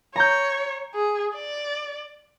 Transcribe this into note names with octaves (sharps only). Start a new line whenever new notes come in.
C#5 A#5 G6
G#4
D5